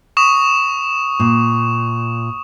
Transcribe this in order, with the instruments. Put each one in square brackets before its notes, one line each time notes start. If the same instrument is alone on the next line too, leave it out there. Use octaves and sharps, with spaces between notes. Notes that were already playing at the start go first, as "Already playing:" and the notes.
[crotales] C#6 D#6 E7
[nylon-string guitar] A#2